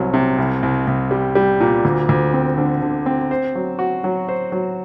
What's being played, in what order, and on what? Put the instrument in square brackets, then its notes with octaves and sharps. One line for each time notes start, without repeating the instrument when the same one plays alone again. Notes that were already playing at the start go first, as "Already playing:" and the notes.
Already playing: [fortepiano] C2 C3 F#3
C3
C2
C2
C2
G3
G3
A#2
D2
D2
C4
D3
D3
C4
C5
F#3
F#4
F#3
C5
F#3